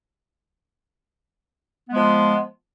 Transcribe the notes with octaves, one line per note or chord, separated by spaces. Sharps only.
F3 G#3 B3